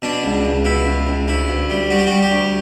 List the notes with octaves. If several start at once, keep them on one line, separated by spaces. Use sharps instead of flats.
B2 D4
C#2
C#2
B2 E4
C#2
C#2
D2 E4
D2
G3
G3 F#4
G4
G3 F#4
G4
D2